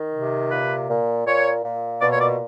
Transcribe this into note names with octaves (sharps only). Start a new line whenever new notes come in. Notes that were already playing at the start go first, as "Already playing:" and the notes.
Already playing: D#3
C3
A#2 B4
A#2
A#2 C#5
A#2
B2 D5
C#5
D5